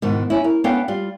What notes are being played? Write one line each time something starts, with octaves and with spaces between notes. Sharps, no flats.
G#2 B2 D#3
C#4 E4
A#4
B3 C#4 D4 A4 F5 G5
G3 F4